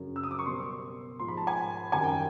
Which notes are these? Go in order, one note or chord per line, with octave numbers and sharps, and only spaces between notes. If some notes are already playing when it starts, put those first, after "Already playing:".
Already playing: F#2 C#3 F#3
E6
D#6
D6
C#6
B2 G3 C6
G#2 F3 C6
B5
A5
G#5
F#2 D#3 G3 G#5
G5